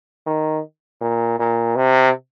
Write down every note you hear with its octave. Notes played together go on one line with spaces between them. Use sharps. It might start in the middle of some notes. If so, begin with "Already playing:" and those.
D#3
A#2
A#2
C3